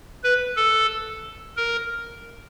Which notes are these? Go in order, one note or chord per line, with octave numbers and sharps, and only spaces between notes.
B4
A4
A#4